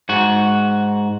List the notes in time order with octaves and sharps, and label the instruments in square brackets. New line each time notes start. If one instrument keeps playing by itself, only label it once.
[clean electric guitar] G#2 F#4